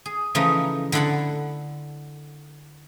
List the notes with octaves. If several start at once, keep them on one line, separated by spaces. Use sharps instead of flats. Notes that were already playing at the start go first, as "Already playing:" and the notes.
G#4
C#3 E3 F3 A3 D#4
D3 E4 A4 F#5 A5 B5